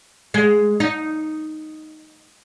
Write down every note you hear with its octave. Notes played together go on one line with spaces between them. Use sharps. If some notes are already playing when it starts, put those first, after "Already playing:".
G#3
D#4